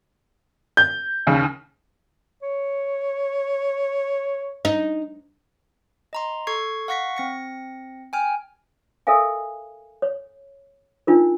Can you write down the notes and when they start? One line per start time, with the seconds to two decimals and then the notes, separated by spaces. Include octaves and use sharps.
0.77 G6
1.27 D#2 C#3
2.42 C#5
4.65 D#4
6.13 D#5 A#5 C6
6.47 A4 C#6 G#6 C7
6.88 F5 F#5 C#6 A#6 B6 C#7
7.16 C4 A#6 C#7
8.13 G5 G#5 F6
9.07 A4 A#4 E5 F5 G#5
10.02 C#5
11.07 D4 D#4 F4 A#4